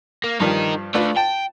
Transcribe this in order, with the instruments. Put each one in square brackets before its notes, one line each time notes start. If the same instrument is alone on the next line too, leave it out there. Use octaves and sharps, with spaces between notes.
[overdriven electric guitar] A#3
[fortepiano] G2 F3 G3 [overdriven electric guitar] D#4 A#4
[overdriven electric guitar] D3 A3 [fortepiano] F4 B4 D5
[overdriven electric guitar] G5 [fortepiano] A5